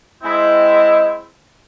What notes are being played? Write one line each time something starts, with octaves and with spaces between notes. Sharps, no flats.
G#3 C4 E4